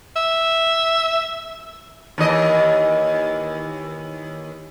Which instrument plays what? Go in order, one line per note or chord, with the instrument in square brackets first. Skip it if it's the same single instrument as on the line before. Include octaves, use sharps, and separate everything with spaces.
[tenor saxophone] E5
[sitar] D#2 E3 D#5